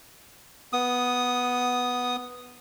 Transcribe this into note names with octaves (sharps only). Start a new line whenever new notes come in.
B3 D#6